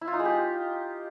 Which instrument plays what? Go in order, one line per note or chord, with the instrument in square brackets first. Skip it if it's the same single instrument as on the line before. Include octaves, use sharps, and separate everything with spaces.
[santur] E4
F4
D#4
G#3
G4